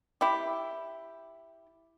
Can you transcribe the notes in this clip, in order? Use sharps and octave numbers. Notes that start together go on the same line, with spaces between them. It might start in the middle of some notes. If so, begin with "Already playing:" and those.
E4 G4